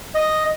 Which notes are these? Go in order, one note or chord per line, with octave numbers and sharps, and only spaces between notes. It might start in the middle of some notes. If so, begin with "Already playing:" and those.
D#5